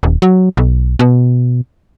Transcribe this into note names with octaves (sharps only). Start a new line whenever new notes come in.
D#1
F#3
B1
B2